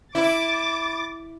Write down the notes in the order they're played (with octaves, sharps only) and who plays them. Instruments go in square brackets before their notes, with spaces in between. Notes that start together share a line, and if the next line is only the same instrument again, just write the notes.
[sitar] E4 [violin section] D6 A6